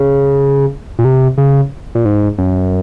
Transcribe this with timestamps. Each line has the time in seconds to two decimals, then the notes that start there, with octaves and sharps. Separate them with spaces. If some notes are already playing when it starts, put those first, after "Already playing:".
Already playing: C#3
0.99 A#2
1.05 C3
1.38 C#3
1.95 A#2
2.05 G#2
2.38 F#2